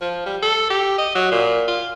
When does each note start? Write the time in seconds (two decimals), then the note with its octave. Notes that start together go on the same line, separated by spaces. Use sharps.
0.01 F3
0.26 G3
0.43 A4
0.70 G4
0.98 D#5
1.15 F#3
1.32 A#2
1.68 F4